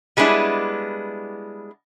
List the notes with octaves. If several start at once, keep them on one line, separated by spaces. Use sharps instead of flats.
G3 G#3 B3 D4 E4